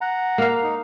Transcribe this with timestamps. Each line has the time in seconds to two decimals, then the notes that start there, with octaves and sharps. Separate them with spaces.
0.01 F#5 A#5
0.38 A#3 F5
0.63 D#4